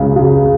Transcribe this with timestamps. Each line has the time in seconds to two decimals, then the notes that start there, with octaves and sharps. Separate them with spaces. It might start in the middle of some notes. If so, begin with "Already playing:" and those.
Already playing: C#2 C#3
0.16 C#3